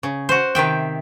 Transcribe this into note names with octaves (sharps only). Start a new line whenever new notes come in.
C#3
F#4 C5
C3 D#3 E5 G5